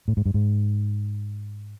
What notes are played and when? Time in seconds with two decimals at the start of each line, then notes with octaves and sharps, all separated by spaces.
0.08 A2
0.17 G#2
0.26 G2
0.34 G#2